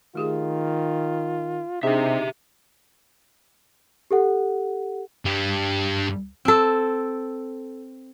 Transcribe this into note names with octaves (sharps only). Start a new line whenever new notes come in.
D#3 A3 F4 G4 G#4
C3 D4 D#4 G4 G#4 E5
G4 A4 F#5
G2 G3
C4 A4